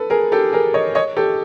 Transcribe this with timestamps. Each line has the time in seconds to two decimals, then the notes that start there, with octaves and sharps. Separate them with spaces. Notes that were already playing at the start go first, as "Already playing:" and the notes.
Already playing: A4 B4
0.10 G#4 A#4
0.32 G4 A4
0.53 G#4 A#4
0.74 C#5 D#5
0.95 C#5 D#5
1.17 G4 A4